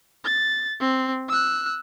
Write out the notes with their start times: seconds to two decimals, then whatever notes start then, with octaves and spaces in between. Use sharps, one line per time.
0.24 A6
0.80 C4
1.29 E6 F#6